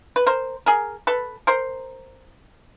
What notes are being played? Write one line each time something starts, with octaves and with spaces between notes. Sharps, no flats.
B4
A#4 C5
G#4 A#4
A4 B4
A#4 C5